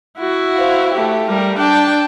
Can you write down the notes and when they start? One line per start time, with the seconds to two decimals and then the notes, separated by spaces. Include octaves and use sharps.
0.18 E4 F#4
0.56 C5 F5
0.93 A3 G4
1.28 G3 A#4
1.58 D4 G5 A5